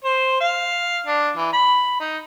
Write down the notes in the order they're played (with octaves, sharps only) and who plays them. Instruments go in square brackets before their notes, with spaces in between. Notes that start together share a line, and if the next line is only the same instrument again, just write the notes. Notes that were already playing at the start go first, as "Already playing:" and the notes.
[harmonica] C5
F5
D4
E3
B5
D#4